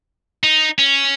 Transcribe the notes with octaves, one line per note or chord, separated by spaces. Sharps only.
D#4
C#4